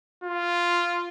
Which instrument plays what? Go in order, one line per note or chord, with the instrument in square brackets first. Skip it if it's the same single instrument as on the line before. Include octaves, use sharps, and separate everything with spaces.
[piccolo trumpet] F4